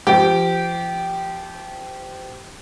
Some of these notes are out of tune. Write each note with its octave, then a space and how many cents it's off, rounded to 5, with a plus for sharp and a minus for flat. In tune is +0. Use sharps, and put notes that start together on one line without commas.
F3 -30 G4 -15